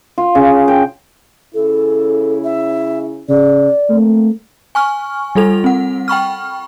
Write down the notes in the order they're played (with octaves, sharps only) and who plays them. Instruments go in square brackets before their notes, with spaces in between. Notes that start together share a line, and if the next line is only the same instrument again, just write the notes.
[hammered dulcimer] F4
C#3
G5
[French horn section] C#3 C#4 E4 [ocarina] A4
[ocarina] E5
[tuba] C#3 [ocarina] D5
[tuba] A3 [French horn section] A#3 C4
[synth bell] G#5 C#6 F6
G3 F4 A4 F7
C4 F#5
G5 B5 C#6 F6